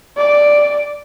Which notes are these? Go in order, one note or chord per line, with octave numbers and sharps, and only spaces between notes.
D5